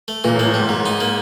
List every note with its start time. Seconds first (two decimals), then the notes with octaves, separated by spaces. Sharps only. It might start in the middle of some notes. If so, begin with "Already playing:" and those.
0.08 A3
0.24 A#2 E3
0.35 A2
0.39 A#3
0.46 A2
0.54 G#2 G3
0.69 G#2 F#3
0.86 D#4
1.00 A#3